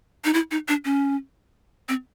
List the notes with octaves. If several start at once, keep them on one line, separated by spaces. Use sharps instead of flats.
D#4
E4
D#4
D4
C#4
C4